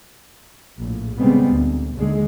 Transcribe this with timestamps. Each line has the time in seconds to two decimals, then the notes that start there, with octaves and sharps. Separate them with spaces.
0.78 A#1 A2
1.18 C#3 G3 G#3 B3 C4
1.50 D2
1.96 D#2 D3 G#3